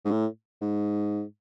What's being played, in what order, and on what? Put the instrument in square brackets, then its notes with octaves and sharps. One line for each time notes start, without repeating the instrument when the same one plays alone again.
[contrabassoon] G#2
A2
G#2